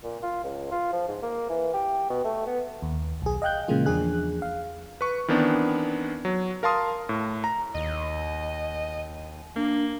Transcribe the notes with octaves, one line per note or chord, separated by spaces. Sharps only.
A#2
F4
C#2
F4
F3
G#2
A#3
E3
G4
B2
A3
B3
D#2
B1 G#4
D#5 F5 G5 F#6 G6
A#2 C#3 E3 G#3 A#3 F4
E2 F3 D4 G#4 F#6
F5
B4 C#6
D#3 E3 B3 C4 D4
F#3
A#4 F5 A5 C6 D#6
A2
A#5
D#2 D#5
A#3 D4